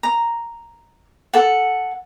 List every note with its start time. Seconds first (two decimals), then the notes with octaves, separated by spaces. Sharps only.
0.03 A#5
1.33 A4 F#5